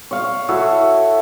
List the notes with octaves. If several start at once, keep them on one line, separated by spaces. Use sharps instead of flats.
C#5 F5
E4 F#4 A4